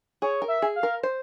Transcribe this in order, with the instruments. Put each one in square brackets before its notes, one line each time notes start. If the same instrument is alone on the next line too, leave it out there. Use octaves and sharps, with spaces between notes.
[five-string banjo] G#4 [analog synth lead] C#5
[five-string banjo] A#4
[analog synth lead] E5
[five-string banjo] G#4
[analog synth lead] F5
[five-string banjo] A#4
C5